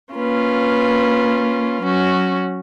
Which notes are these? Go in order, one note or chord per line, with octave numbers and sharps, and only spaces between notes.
A#3 C#4 F4 B4
F#3 C#4 F#4